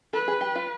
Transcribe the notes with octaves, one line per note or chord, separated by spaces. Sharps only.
A4 B4
G#4
G4
F4